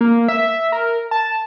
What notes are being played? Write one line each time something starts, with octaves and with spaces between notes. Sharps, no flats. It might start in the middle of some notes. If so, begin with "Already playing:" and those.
A#3
E5
A#4
A5